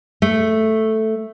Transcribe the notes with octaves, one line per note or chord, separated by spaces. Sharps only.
A3